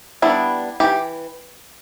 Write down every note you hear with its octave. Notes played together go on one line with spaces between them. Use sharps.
G3 B3 D4 E4
E3 G4